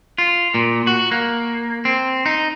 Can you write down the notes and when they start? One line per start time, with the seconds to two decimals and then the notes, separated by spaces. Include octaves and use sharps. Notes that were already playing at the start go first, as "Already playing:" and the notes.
0.18 F4
0.54 A#2
0.87 F#4
1.12 A#3
1.85 C4
2.26 D#4